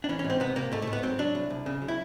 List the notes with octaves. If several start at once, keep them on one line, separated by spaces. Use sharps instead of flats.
D4
E3 C#4
C#4
G#2
C4
C3 B3
C3 A#3
G#2 A3
A3
G#2
B3
F#3 C4
F#3 D4
C2
C2
C#3
F#3
E4